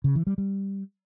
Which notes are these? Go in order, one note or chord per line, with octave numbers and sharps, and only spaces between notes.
C#3
E3
G3
G3